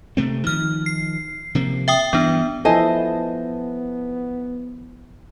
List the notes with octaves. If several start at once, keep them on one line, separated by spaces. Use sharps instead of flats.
C3 A3 C4
D#3 F3 F6
C7
C3 F3 A#3
E5 G5 D#6
G2 E3 B3 D4
F3 B3 E4 A4 C5 D#5 G#5